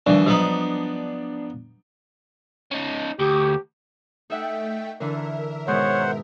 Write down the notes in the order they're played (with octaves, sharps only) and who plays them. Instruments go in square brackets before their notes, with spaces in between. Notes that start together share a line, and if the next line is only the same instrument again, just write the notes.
[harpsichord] D#2 E3 [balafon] F3 G3 [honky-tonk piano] D4
[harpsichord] F3 B3 D#4 [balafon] F#3
[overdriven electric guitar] C#4 D#4
[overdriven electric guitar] D2 [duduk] G4
[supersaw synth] A3 G5 B6 [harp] D#4 E5 F#5
[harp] D3 E3 D4 [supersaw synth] A#4 E5
[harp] G#2 B2 D#3 [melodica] C5 F#5 [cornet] C#5